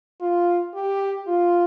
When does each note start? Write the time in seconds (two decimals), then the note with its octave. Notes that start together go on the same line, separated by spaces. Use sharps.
0.21 F4
0.74 G4
1.27 F4